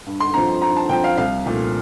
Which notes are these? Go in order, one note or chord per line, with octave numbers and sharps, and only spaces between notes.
G2
C6
F3 C4 A#5
G2 A#5
A5
F3 C4 G5
F5
C2 F5
A#2 F3 A3